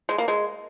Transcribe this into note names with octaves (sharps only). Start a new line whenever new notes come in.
G#3
A#3
G#3